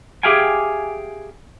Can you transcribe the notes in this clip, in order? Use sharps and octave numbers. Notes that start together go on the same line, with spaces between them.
G4 G#4 E5 F5 G5 G#5